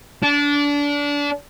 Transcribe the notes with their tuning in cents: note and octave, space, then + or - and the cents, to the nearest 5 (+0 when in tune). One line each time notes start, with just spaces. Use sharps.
D4 -25